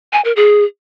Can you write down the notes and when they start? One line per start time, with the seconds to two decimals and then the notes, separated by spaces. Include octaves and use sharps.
0.13 G#5
0.25 A#4
0.36 G#4